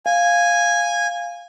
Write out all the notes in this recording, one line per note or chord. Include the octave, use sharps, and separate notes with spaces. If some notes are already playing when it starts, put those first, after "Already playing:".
F5 G#5